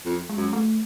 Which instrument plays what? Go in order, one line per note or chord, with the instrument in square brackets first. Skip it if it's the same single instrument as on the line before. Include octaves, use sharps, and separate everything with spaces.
[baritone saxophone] F2
[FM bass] G#3
[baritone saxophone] F#2
[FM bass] A3